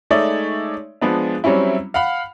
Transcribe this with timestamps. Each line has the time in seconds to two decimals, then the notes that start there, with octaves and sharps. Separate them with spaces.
0.10 G#3 A3 D#4 C#5 D5 E5
1.01 F3 G#3 B3 D4
1.44 F#3 G3 C4 C#4 E4
1.94 F5 F#5 B5 F6